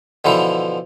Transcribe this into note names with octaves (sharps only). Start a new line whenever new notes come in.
B2 D3 E3 F3